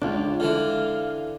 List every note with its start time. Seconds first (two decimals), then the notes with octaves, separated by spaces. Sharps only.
0.02 C#2 D4 F4
0.40 D3 E3 F5